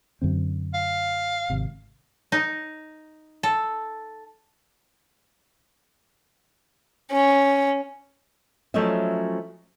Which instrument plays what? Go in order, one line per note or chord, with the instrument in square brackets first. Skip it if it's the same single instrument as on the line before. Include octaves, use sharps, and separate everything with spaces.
[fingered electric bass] F#2 D3 C4
[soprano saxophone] F5
[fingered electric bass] G#1 C3
[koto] D#4
A4
[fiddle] C#4
[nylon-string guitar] F3 F#3 A3 C#4 D#5 E5